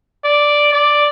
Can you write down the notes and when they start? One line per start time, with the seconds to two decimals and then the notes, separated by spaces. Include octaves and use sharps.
0.25 D5
0.73 D5